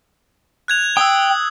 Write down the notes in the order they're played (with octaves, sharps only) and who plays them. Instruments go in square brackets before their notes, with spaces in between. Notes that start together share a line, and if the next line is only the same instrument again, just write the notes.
[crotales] F#6 G#6 F7
[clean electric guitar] G5 [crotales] D#6 E6